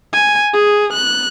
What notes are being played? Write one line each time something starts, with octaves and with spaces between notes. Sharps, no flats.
G#5
G#4
F#6